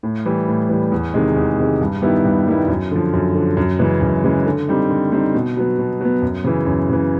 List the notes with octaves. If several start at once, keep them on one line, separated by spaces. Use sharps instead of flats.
A2
E3 G3
A2
E3 G3
E2
C3 D#3 G#3
E2
C3 D#3 G#3
G2
D#3 G3 B3 E4
G2
D#3 G3 B3 E4
F#2
D3 F3
F#2
D3 F3
F#2
C#3 E3 G#3
F#2
C#3 E3 G#3
D3
G3 C4 D#4
D3
G3 C4 D#4
B2
F#3 B3
B2
F#3 B3
F#2
C#3 E3
F#2
C#3 E3